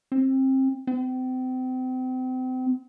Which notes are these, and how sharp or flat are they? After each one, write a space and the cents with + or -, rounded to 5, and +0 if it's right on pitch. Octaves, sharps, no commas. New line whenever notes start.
C4 +25
C4 -35